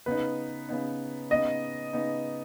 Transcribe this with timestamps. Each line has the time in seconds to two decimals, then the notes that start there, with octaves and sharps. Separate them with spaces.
0.06 C#3 B3 D#4 B4
0.69 C#3 B3 D#4
1.30 C#3 B3 D#4 D#5
1.93 C#3 B3 D#4